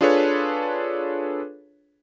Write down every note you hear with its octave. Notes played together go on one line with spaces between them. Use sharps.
D4 F4 G#4 A4 B4 C#5